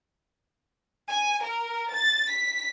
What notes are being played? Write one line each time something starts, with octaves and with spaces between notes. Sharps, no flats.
G#5
A#4
A6
B6